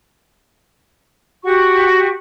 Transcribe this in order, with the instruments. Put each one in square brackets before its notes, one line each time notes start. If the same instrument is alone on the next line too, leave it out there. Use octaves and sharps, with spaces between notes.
[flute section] F#4 G4 F#5 C#6